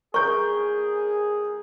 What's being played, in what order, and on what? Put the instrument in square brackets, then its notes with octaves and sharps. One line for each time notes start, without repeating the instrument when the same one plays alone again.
[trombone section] C2 G#4 [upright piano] A#4 G6 [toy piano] C#6